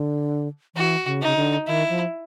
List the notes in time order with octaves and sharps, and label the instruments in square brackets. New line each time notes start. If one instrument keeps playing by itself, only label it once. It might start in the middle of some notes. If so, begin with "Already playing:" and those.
Already playing: [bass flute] D3
[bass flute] E3 [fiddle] F#4
[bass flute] C#3
[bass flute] C#3 [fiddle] D#4
[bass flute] D3
[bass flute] D#3 [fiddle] E4
[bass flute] F3